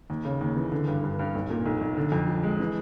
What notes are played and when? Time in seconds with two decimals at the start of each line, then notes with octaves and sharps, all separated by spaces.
0.10 D#2
0.25 C#3
0.41 D#2
0.56 E3
0.72 D3
0.87 G2
1.04 G2
1.19 G2
1.35 B1
1.50 A#2
1.66 B1
1.81 B1
1.97 D3
2.12 F2
2.28 F3
2.43 G#3
2.60 E3